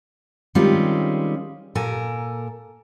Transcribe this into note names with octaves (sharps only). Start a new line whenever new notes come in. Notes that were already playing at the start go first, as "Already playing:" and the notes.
D#3 G3 G#3 C4 C#4 F4
A#2 A4 A#4 G#5